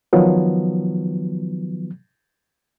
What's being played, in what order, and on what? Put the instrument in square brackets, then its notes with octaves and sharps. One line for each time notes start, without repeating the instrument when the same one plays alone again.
[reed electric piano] D#3 F3 F#3 B3